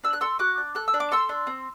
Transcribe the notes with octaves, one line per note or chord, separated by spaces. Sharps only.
D4 E6
F#6
A4 C6 E6
F#4 D6 F#6
D4
A4 F#6
E6
D4
D6
A4 C6 E6
D4
C4